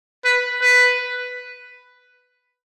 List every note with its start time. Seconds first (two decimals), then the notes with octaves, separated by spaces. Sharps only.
0.25 B4
0.61 B4